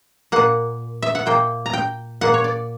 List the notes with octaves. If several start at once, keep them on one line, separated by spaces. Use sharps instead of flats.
A#2 A#3 F#5
E5
F#5
A#2 A#3 G5
A#5
G5
A#2 A#3 F#5
C#5
D5